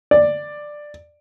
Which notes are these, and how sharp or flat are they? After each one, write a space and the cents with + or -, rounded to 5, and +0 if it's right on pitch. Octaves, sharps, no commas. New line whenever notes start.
D5 +10